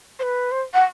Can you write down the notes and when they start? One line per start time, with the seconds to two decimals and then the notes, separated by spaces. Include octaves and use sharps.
0.19 C5
0.23 B4
0.52 C5
0.74 F#5